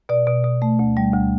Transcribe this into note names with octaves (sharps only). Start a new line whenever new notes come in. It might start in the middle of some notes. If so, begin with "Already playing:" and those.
B2 D5
B2
B2
A3
D2
G3
D2